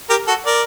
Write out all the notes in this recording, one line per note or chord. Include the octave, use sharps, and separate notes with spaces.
G4 A#4
F#4 A4
A#4 D5